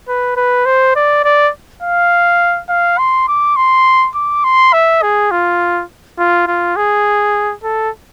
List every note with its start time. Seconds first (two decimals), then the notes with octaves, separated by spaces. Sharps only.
0.08 B4
0.37 B4
0.66 C5
0.96 D5
1.24 D5
1.82 F5
2.69 F5
2.98 C6
3.28 D6
3.56 C6
4.15 D6
4.44 C6
4.73 E5
5.02 G#4
5.31 F4
6.18 F4
6.47 F4
6.76 G#4
7.64 A4